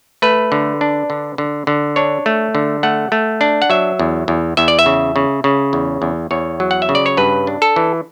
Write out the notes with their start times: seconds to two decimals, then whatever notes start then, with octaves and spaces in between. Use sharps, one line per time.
0.22 A3 B4
0.52 D3
0.81 D4
1.10 D3
1.38 D3
1.67 D3
1.96 D4 C#5
2.26 A3
2.55 D3
2.83 A3 F#5
3.12 A3
3.41 D4
3.62 F#5
3.70 F#3 E5
3.99 E2
4.28 E2
4.57 E2 E5
4.68 D5
4.79 E5
4.86 C#3
5.16 C#3
5.44 C#3
5.73 E2
6.02 E2
6.31 E2 C#5
6.60 F#3
6.71 F#5
6.82 E5
6.89 C#3
6.95 D5
7.06 C#5
7.17 G2 B4
7.47 D4
7.62 A4
7.76 E3